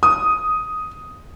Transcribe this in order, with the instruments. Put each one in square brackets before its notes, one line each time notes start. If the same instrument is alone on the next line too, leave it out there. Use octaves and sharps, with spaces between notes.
[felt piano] D#6